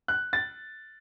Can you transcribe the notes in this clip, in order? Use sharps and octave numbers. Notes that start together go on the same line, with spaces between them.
F#6
A6